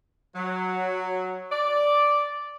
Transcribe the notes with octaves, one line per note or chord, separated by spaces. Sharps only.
F#3
D5